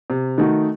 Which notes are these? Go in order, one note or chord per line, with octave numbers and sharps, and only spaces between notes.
C3
D#3 A3 D#4 F#4